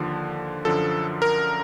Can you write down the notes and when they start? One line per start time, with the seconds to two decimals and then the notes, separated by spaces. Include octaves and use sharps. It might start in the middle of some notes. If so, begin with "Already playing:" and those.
Already playing: D#2 D3 F3
0.65 F#2 D3 F3 A4
1.22 A#4